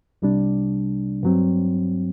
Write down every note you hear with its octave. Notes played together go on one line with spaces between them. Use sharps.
C2 C3 G3 D4
G2 F#3 C4